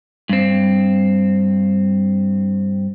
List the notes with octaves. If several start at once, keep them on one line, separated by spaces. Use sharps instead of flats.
G2 C4